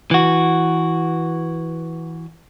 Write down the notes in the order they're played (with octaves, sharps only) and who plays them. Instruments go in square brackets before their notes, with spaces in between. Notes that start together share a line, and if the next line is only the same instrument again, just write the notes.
[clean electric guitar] E3 F#4